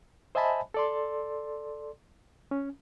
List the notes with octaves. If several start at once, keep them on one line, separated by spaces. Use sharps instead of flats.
C5 D#5 E5 G#5 A5 B5
A4 D5 C6
C#4